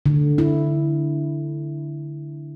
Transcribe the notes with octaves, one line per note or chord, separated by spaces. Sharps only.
D3
E4